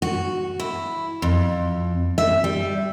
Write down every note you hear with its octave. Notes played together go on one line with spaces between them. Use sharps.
F#4
E4
F2
E5
G3